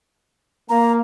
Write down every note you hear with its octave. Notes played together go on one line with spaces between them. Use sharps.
A#3 A#5